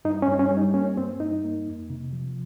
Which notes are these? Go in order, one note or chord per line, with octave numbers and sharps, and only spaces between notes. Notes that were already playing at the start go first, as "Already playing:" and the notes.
G2 D#4
C#4
G2
C#4
G3
D#4
A#3 C#4
G2 C4
G2 D#4
A#3
F2
C3
F3